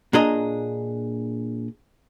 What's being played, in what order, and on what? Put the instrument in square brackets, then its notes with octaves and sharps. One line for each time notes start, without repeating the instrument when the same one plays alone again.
[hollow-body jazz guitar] A#2 D4 G#4 D#5 A#5